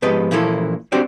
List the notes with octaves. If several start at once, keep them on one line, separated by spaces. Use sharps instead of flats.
G#2 F3 B3 G4 B4 D#5
A#2 E3 F3 A#3 E4 A4
C4 D4 F#4 G4 C5 D5